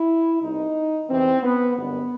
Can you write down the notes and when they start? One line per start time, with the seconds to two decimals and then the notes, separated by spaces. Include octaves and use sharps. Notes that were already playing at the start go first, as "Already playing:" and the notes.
Already playing: E4
0.41 C2 B2 D#4
1.09 E2 C3 E3 C4
1.43 B3
1.76 G1 F#2 D#3 B3